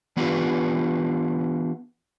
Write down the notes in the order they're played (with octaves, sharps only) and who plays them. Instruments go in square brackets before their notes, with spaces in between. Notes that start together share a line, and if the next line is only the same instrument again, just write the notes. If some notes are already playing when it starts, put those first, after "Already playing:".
[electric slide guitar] E3 B3 D4 F4 G4 B4